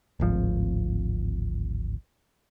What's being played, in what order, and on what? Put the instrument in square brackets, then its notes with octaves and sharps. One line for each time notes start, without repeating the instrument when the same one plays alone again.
[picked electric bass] D1 G#1 F3